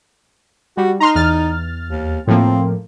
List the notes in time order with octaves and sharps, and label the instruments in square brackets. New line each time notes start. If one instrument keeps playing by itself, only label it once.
[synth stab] G3 [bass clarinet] F#4
[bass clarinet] D#4 [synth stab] A#5 C6 F6
[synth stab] E2 F6 A6
[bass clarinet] D#2
[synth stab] A2 F3 A#3 [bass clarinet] C4